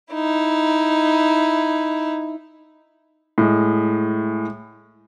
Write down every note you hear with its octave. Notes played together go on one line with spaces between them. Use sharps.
D#4 E4
A2 G#3